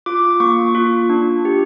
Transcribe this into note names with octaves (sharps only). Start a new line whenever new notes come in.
F4 D6
A#3 C#6
F4
D4
G4